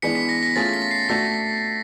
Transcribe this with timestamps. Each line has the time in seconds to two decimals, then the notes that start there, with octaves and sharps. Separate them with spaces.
0.02 E3 G#3 B3 D4 B6 C#7
0.15 B6
0.29 A#6
0.43 A#6
0.56 A3 C#4 F4 G#4 A6
0.74 B6
0.91 C7
1.09 A3 D4 F#4 A4 A#6